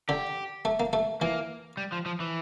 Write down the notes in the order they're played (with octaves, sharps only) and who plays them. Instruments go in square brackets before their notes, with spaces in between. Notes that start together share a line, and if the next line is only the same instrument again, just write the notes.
[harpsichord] D3 [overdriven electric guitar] G4
[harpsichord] A3
A#3
A3
[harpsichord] E3 [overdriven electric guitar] A#3
[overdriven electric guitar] G3
F3
F3
E3